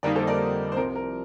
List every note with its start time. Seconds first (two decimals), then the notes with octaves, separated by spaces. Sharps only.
0.03 F2 D3 G3 A#3 D#4 A#4 D5
0.16 A4 C5
0.27 A#4 D5
0.72 C5
0.76 C2 C3 F3 A#4
0.95 A#4